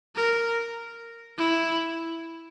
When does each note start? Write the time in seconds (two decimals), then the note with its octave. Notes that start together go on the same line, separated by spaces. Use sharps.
0.16 A#4
1.37 E4